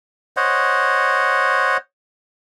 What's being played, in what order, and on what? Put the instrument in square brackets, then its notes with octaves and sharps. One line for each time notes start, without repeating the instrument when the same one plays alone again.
[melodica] C5 C#5 D#5 F#5